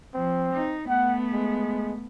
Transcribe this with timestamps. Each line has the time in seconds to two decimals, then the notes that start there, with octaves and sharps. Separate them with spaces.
0.14 F3 C4
0.53 D#4
0.89 A3 B3 F#5
1.33 G#3